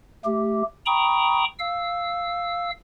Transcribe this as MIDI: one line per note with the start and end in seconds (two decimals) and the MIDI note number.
0.25 0.63 57
0.25 0.63 67
0.86 1.44 79
0.86 1.44 82
0.86 1.44 83
0.86 1.44 85
0.86 1.44 87
1.59 2.71 77
1.59 2.71 88